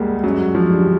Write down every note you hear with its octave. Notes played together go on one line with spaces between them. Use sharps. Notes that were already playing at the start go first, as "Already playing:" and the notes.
Already playing: D2 G3 G#3 A#3
F#2 F#3
F3
D3 G3